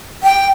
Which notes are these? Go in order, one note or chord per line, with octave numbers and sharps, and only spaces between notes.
G5